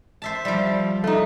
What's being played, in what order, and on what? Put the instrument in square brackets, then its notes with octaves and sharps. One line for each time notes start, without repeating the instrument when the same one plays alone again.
[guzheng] C5 E5 A5
F3 G3
[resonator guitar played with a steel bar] A3 D#4